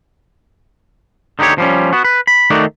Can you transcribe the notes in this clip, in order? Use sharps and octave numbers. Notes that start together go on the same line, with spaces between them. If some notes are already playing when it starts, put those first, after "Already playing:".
D3 D#4 F#4 G4 C#5
F3 G3 C#4
B3 F#4
B4
B5
D#3 A3 D#4 F#4 D5